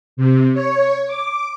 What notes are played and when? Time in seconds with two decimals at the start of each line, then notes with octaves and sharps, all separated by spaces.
0.17 C3
0.54 C#5
1.07 D6